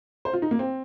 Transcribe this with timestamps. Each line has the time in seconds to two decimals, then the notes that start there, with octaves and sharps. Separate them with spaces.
0.25 C5
0.33 F4
0.42 D#4
0.51 A#3
0.59 C4